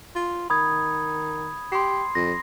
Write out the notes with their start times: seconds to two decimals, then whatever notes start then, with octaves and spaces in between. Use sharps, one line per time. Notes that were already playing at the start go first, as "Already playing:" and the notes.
0.15 F4
0.50 D#3 B5 D#6 G#6
1.72 G4 C6 C7
2.15 F2 A#6